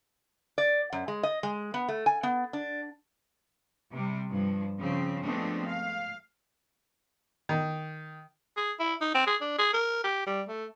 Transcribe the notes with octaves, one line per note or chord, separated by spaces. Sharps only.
D5
F#2
G#3
D#5
G#3
B3
A3
G#5
B3
D4
C3 G3
G2 F3
C#3 F3 C4
F3 G#3 A3 B3 C4 D4
F5
D#3
G#4
E4
D#4
C4
G#4
D4
G#4
A#4
G4
G3
A3